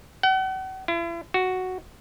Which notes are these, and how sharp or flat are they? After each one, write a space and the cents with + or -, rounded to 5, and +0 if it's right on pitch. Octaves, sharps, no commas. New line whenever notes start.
F#5 +40
E4 +40
F#4 +0